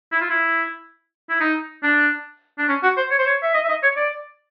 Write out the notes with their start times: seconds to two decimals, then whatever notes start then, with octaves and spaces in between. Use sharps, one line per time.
0.12 E4
0.21 F4
0.30 E4
1.29 E4
1.40 D#4
1.83 D4
2.58 D4
2.68 C#4
2.83 F#4
2.97 C5
3.11 C#5
3.18 C5
3.26 C#5
3.42 E5
3.54 D#5
3.64 E5
3.68 D#5
3.83 C#5
3.96 D5